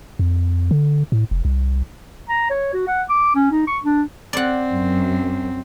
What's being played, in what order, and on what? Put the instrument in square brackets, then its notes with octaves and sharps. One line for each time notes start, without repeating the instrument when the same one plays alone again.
[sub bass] F2
D3
A2
F1
C2
[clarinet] A#5
C#5
F#4
F#5
D6
C#4
D#4
C#6
D4
[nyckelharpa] C4 [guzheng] D5 F#5
[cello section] F#2